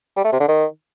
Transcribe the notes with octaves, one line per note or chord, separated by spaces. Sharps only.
G3
A3
C3
D3
D#3